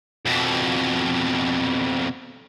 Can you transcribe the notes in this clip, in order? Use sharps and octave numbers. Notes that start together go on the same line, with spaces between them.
F2 B2